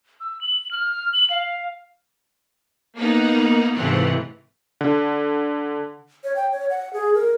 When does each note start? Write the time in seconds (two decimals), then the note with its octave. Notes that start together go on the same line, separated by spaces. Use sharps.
0.20 E6
0.41 F#7
0.71 F6
1.13 F#7
1.30 F5
2.95 A#3 B3 D#4 F#5
3.74 G#2 C3 E3 A3 F4 F#5
4.81 D3
6.24 C#5
6.36 G5
6.52 C#5
6.70 F#5
6.93 G#4
7.14 A#4